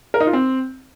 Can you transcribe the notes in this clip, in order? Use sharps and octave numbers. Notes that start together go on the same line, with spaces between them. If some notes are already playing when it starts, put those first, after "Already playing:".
A#4
D#4
F4
C4